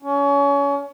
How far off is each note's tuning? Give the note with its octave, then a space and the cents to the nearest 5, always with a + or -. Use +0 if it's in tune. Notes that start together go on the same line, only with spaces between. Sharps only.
C#4 +30